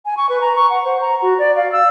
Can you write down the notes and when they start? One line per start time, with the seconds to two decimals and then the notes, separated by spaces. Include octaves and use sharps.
0.05 G#5
0.17 C#6
0.29 B4
0.41 A#5
0.56 C#6
0.70 F#5
0.84 C5
1.01 A#5
1.22 F#4
1.39 D5
1.56 F5
1.72 E6